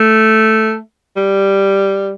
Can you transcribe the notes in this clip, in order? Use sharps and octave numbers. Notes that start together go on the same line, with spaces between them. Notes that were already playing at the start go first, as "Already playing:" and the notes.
Already playing: A3
G3